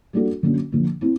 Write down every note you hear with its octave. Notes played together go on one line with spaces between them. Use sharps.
G3 A#3 D4 F#4 A4
D3 F#3 A#3 C#4
D3 F3 A#3
C4 E4